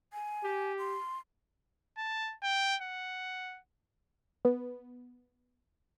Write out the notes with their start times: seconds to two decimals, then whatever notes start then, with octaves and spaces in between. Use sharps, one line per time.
0.13 G#5
0.43 G4
0.78 C6
1.97 A5
2.43 G5
2.82 F#5
4.45 B3